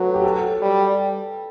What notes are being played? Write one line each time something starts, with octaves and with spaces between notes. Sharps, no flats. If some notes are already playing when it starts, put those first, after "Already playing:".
Already playing: F#3 F#4 A4 B4
G4
A4
G3